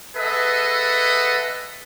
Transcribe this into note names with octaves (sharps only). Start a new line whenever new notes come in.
G#4 A4 B4 D#5 E5 F#5